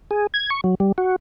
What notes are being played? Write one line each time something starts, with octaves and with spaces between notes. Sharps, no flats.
G#4
G#6
C#6
F#3
G3
F#4